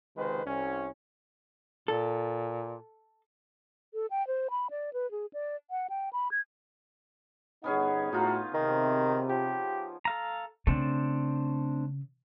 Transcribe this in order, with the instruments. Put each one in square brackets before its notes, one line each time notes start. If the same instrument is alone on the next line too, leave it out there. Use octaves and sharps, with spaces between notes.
[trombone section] C#2 C3 D#3 G#3 B4 C5
C2 C#4
[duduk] A#2 [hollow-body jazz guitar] A4
[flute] A4
G5
C5
B5
D5
B4
G#4
D5
F#5
G5
B5
G#6
[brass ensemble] G1 D#4 F#5 [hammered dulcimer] B3 C#4 G#4
[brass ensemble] A2 F#4 A#5 [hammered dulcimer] D#4 F4
[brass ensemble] C3 [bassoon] D#3
[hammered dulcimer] F3 [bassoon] G4
[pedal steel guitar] A4 F5 A#5
[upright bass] C#3 [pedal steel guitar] A3 C4 D4